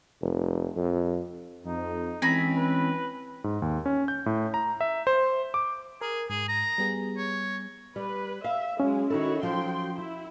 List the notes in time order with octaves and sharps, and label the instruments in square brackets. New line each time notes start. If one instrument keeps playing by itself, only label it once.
[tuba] F1
F2
[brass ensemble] F2 [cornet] D#4
[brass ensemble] E3 G#3 C#4 [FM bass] C4 [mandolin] G#5 A#5 B5
[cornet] B4
[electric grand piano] G#2
D#2
C#4
G6
A2
A#5
E5
C5
D6
[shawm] G#4 [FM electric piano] A#4
[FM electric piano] G#2 [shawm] G#4
[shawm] A#5
[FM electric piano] G3 B3 G#4
[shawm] C#5
[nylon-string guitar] G3 [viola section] B4
[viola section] E5 [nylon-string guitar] F5
[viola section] F#3 G#3 [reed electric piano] C#4
[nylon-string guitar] D#3 D#4 A4 [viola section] E4 F#4 C#5
[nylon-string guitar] F3 F4 [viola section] F#3 G5 C6
[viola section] E4